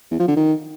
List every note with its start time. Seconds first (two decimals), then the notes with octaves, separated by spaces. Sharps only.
0.11 E2
0.19 F3
0.28 D3
0.36 D#3